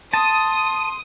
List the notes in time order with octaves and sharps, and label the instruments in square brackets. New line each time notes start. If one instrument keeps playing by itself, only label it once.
[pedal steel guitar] A5 [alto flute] C6 [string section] D#6